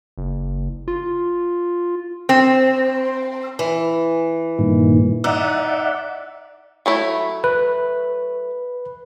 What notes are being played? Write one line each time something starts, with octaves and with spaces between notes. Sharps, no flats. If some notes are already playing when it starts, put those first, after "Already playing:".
F#1
F4
C4
E3
G2 A#2 D#3
D#4 D5 E5 F#5
F#3 A3 E4
B4